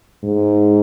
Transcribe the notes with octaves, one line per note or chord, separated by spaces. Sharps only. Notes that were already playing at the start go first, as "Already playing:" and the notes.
G#2